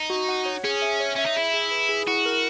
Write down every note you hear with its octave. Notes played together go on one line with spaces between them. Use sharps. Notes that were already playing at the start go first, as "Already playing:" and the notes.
Already playing: D#4
F#4
F#5
C#5
C#4 G#4
E5
C#5
C#4 E5
D#4
E4 G#4
G#4
B4
G#4
E4 F#4
A#4